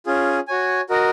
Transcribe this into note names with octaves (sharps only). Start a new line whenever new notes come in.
C#4 F4 G#4
F#4 C#5 G#5
F#4 A#4 D#5